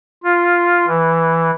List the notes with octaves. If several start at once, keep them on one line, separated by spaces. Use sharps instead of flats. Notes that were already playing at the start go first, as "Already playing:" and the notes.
F4
E3